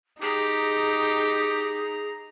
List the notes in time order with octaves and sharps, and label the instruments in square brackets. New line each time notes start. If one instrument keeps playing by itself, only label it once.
[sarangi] D#4 [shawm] G4 [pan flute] G#4 [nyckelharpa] A#5